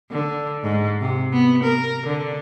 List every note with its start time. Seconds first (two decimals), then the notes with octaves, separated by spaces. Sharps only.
0.11 D3
0.63 G#2
1.01 C3
1.33 B3
1.64 A#4
2.07 D3